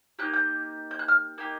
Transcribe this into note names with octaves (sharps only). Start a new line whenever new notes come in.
A#3 D#4 G4 F#6
G6
G6
F#6
F6
A#3 D#4 G4